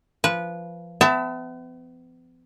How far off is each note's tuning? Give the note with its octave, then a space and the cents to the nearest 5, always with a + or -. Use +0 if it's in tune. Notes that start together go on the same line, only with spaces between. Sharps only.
F3 -20 B4 -15
B3 +40 E5 +5 A5 +15